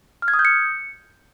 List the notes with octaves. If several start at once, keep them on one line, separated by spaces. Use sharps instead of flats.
F6
G#6
D#6
G6
C#7